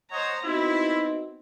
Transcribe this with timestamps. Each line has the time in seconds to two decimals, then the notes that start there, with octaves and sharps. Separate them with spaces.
0.11 C5 C#5 D#5 F#5 A#5
0.44 B3 C4 D#4 E4 F#4